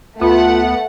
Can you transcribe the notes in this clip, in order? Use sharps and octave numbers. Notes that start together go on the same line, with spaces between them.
D2 A3 B3 F4 F#5